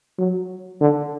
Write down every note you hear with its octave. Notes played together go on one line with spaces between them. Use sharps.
F#3
D3